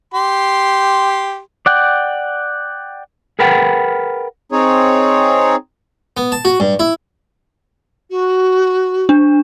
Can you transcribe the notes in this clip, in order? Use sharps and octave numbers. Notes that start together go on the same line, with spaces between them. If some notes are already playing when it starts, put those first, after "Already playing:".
G4 C6
D5 F#5 G5
G#4 A#4 B4 F#5 G5
C4 D#4 G#4 C#5
B3
A5
F#4
G2
E4
F#4
D4